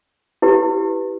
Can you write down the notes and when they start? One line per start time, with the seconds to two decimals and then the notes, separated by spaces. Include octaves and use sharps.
0.42 E4 G4 B4